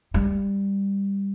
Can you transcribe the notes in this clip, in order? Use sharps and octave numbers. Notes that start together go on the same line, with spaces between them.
G3